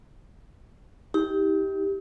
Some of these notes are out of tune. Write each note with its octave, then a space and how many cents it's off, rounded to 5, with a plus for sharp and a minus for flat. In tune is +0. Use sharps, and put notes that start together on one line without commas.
D#4 +45 G4 +0